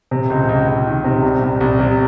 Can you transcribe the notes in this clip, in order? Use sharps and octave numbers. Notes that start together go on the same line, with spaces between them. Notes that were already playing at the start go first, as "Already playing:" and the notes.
C3
C#2
C#2
C#2
D#3
C3
C2
C2
C2
C3